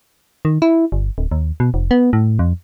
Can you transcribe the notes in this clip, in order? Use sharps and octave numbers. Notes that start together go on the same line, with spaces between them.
D#3
E4
G1
D1
D#2
B2
F1
B3
A2
F2